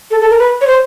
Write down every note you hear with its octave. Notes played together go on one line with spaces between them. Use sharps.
A4
A4
A#4
B4
C#5
C5